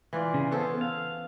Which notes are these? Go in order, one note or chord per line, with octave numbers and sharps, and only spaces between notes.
E3 F4 D5
C#3
B3 C#4 A4 C5
F5